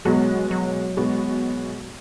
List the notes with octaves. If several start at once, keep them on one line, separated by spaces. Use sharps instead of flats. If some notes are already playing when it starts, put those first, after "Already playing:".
B2 F#3 G#3 B3 F#4
F#3
B2 G#3 B3 F#4